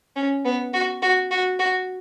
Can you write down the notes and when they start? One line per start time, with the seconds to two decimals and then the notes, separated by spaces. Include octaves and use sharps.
0.16 C#4
0.45 B3
0.74 F#4
1.02 F#4
1.31 F#4
1.59 F#4